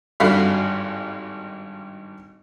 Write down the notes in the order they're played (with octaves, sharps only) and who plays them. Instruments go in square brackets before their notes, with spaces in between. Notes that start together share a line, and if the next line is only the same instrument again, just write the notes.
[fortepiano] G#1 G2 D3 F#4 F5 B5